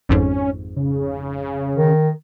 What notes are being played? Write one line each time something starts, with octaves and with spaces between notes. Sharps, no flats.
G#1 F2 G#2 C#4
C#3
D#3